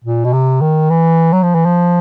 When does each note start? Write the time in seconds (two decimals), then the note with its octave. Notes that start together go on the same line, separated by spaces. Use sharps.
0.04 A#2
0.24 B2
0.33 C3
0.61 D#3
0.90 E3
1.33 F#3
1.43 F3
1.55 E3
1.65 F3